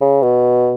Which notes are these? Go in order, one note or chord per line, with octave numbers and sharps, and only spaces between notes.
C#3
B2